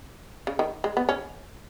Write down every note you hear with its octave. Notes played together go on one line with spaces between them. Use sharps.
C#3
D#3
G#3
B3
C#4